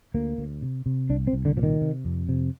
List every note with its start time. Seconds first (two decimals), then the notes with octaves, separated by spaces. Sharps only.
0.14 D2 A#3
0.38 D2
0.62 C3
0.86 C3
1.09 C2 D4
1.27 C4
1.33 C2
1.45 D3
1.57 A#2 F3
1.63 D#3
1.81 C3
2.05 F2
2.29 C3